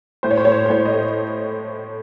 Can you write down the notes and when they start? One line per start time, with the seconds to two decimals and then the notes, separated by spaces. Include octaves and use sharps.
0.23 A2 C5
0.31 C#5
0.37 C5
0.45 A2 C#5
0.52 C5
0.66 C5
0.70 A2 C#5
0.86 D#5
0.94 A3